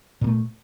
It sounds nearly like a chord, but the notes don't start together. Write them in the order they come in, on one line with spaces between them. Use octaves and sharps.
A#2 A#3 A3